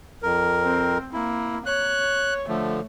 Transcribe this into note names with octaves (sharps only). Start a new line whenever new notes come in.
F2 A#4
C4
A#3 E4
C#5 F#6
D3 F3 A3